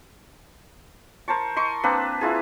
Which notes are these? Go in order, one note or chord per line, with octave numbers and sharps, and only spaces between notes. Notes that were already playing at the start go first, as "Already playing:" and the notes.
A#4 C5 A5 C#6
D#5 C6 C#6
A#3 C4 D4 B4
E4 F4 G#4